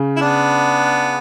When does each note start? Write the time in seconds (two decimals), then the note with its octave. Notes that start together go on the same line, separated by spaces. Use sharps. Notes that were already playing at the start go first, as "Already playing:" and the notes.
Already playing: C#3
0.16 E4
0.21 B3 D4